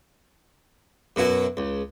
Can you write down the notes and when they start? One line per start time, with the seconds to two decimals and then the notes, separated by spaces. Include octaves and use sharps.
1.16 F#2 B2 E4 F#4
1.57 C#2